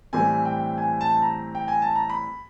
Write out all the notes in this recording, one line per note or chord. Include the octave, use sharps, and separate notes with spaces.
A2 E3 G3 C4 G#5
G5
G#5
A5
A#5
G5
G#5
A5
A#5
B5